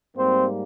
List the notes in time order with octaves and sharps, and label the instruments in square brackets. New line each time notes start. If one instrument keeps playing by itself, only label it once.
[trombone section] G#2 G3 A#3 C4 C5